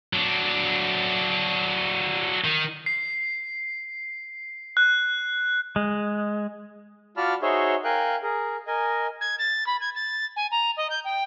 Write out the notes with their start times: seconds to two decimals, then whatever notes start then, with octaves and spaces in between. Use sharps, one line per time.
0.13 F#3 D4
2.44 D#3
2.86 C7
4.77 F#6
5.76 G#3
7.17 F4 F#4 D5 A5 B5 F6
7.42 D#4 F#4 G#4 C5 C#5 E5
7.84 A#4 F5 G5 G#5 F#6
8.23 G#4 A#4
8.67 A#4 D#5 G#5
9.21 G#6
9.39 A6
9.67 B5
9.81 G#6
9.95 A6
10.36 G#5
10.51 A#5
10.77 D#5
10.90 G6
11.05 G5